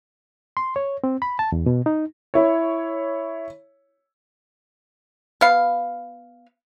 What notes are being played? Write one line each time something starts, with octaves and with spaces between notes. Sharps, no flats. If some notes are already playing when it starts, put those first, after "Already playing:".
C6
C#5
C4
B5
A5
E2
B2
D#4
E4 C#5
B3 F5